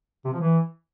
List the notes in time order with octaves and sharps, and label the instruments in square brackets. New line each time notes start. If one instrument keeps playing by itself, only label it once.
[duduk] C3
F3
E3